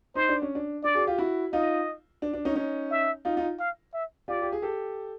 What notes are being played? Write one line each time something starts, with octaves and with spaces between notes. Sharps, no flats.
D#4 C5
D4
C#4
D4
D4 D5
F#4 G#4
F4 G4
E4 F#4
D#4 F4 D#5
D4
D4
C#4 D#4
C#4 D#4
E5
D#4 F4
D#4 F4
F5
E5
F4 G4 D5
G4
G#4
G4 A4